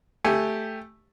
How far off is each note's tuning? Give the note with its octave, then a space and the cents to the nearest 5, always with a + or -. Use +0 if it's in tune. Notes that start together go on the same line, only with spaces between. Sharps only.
A3 +0 G4 +5 G#5 +0